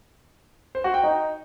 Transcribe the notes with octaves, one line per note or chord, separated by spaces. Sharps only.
C5
F#4
G5
D#4